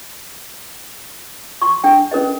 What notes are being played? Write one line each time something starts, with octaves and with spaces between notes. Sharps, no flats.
C6 C#6
D4 G5
C#4 A#4 B4 D#5